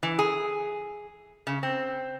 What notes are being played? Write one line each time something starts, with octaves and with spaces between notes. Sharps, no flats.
E3
G#4
C#3
C4